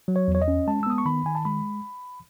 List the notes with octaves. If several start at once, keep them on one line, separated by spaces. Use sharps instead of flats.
F#3
C#5
E2
C#5
D#5
C#4
G#3 A5
E6
B3 D#6
C#6
D#3 B5
D#3 G#5
A5
G#3 B5